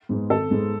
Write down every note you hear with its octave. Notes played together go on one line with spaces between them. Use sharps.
G#2 G#3 B3
G#1 A4
G#2 G#3 B3